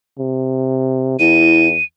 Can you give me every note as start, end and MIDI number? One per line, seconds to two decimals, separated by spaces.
0.19 1.16 48
1.19 1.77 40
1.19 1.68 64
1.19 1.84 99